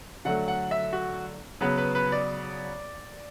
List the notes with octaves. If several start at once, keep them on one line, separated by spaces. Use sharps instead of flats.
D3 F#3 A3 F#5
F#5
E5
F#4
C#3 F#3 B3 B4
B4
B4
D5